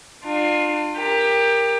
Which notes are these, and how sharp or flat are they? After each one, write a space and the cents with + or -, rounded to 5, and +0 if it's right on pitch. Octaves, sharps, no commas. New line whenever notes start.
D4 +40 F4 +15
G4 +20 A#4 +0